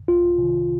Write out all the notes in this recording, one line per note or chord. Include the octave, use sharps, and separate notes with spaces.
C2 F4
C3 D#3